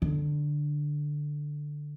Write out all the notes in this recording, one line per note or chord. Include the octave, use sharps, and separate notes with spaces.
D3